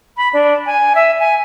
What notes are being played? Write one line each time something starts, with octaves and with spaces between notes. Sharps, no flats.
B5
D4
G#5
E5
G#5